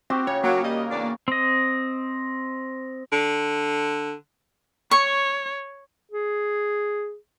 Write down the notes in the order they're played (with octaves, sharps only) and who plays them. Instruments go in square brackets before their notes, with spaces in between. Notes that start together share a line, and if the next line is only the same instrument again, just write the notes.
[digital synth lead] C4 [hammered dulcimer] F#4 G4
[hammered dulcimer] C#3 [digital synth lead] C#5
[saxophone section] F#3 [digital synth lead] A#3
[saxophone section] G3 D#5
E2 D4 D5
[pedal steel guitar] C4 D#5
[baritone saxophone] D3
[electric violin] C#5 [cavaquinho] C#6
[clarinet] G#4